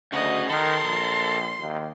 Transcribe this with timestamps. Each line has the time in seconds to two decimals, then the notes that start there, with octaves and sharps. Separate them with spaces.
0.12 D2 C#3 F#4 D#5
0.49 D#3 A4 A#4 C6
0.84 A#1
1.60 D#2